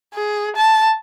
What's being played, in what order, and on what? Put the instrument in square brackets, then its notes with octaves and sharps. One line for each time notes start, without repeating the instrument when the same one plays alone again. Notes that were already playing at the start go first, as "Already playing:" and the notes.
[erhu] G#4
A5